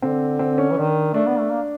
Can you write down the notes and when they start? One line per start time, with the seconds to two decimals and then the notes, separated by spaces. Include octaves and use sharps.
0.02 D3 C4
0.39 C4
0.58 C#4
0.71 E3
0.77 D#3 D4
1.14 A3 D4
1.27 B3
1.39 A3
1.51 A#3